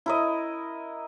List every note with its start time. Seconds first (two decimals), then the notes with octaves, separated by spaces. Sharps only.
0.06 E4 A#4 D#5